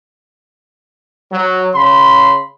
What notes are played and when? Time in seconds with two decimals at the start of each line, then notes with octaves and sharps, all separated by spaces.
1.32 F#3
1.75 C#3 B5 C6